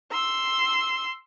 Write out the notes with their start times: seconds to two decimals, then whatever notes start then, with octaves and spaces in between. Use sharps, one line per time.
0.11 C6 E6